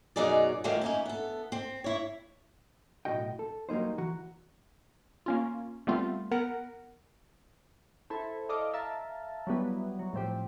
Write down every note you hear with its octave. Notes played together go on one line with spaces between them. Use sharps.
F#2 B2 F#3 D#4 G#4 D5
D#3 E3 F#3 G3 A3 F4
C#4 D#4 E4
B3 A4
C4
E4 C#5
B1 E2 A2 F#4 D#5 G5
A4
F#3 G3 A#3 D#4 C5
E3 F#4 A#5
A#3 C#4 F4
G3 A3 B3 C4 F4
B3 A#4 F#5
E4 A4 C5
A4 D5 D#5 F5 D6
E5 F5 A5 A#5
F#3 G3 B3 E4
F#3
A2 F3 C4 G4